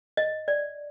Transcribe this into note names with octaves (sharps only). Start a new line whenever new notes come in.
D#5
D5